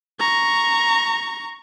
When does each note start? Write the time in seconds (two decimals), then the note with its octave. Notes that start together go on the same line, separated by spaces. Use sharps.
0.20 A#5 C#6